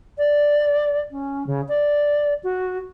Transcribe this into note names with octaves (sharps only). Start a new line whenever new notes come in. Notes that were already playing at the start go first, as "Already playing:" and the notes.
D5
C#4
C#3
D5
F#4